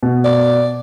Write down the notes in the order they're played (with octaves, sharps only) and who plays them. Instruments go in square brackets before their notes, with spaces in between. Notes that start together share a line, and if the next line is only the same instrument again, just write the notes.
[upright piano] B2
[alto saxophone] D5